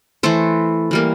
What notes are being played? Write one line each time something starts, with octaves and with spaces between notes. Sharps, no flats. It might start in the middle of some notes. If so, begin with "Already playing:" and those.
E3 A3 A4 C5
E3 G3 A#3